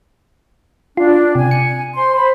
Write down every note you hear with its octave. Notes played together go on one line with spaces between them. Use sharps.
D4 F4
C3 G#5
C#7
C5 C6
C5 B5